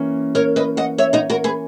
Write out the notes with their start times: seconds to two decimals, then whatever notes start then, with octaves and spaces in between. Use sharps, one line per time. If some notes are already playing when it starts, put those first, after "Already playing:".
Already playing: E3 A#3 C#4
0.35 A#4 C#5
0.56 B4 D#5
0.77 D#5 F#5
0.98 C#5 E5
1.13 D#4 F#4
1.30 F#4 A#4
1.44 G#4 B4